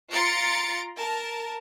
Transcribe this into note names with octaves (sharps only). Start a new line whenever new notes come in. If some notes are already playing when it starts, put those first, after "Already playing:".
F4 A#5 C6 A6 C#7 D7
A#4 A5